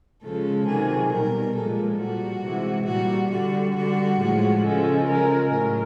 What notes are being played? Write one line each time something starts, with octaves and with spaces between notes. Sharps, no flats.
C#3 F3 G#3 A4
C3 D#3 F#3 G#4
B2 G3 A#4
A#2 F3 G#3 A4
A#2 G3 F#4
C3 E3 G#3
A#2 G3 F#4
D3 G3 F#4
D3 G3 F#4
A2 F3 G#3
C#3 F3 G#3 A4
C#3 F3 G#3 A#4
A2 F#3 A#4